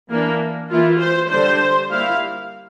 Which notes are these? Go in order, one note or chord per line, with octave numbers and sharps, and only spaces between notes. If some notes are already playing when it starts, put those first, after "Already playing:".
E3 A#3 D4
E3 A#3 E4 F4
C5
D3 G3 D4 C5
G3 A#3 E4 F5